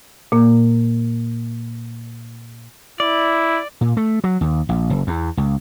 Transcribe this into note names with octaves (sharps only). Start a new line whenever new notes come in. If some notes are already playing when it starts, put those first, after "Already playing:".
A#2 A#3
E4 D5
A#2
A3
F#3
D#2
A#1
F#1
E2
C#2